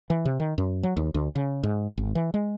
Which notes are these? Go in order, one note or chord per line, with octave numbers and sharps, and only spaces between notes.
E3
C3
D#3
F#2
F#3
D#2
D2
C#3
G#2
G#1
E3
G#3